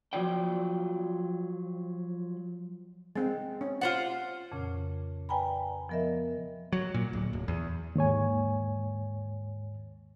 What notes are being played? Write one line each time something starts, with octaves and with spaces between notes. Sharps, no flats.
F3 F#3 F4 D5 G5
G#3 C4
C#4
F4 C5 F#5
F2 A#2 C#3 C#4
B4 D5 G5 G#5 A#5 B5
F3 B3 A#4 D#5 E5
F#3
A#2
D1
D1
E2
D#2 G#2 C#5 G#5